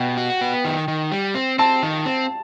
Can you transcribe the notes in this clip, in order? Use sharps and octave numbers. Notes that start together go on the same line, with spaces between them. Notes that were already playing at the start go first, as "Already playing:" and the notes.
Already playing: B2 F#5 G5
F#4
B3
D#3
D#3
G3
C4
C4 A5
D#3
C4